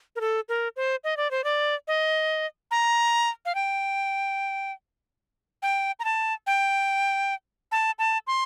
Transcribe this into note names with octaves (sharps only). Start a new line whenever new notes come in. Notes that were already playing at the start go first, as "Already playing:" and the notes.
A#4
A4
A#4
C5
D#5
D5
C5
D5
D#5
A#5
F5
G5
G5
A#5
A5
G5
A5
A5
C6